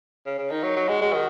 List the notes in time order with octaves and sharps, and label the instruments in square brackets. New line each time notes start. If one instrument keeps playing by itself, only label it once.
[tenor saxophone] C#3
C#3
[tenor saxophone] D#3 [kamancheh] D#4
[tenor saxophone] F#3
F#3
[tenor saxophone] G#3 [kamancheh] F#4
[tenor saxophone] G#3
D#3